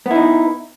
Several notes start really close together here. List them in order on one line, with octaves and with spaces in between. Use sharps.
B3 E4 D#4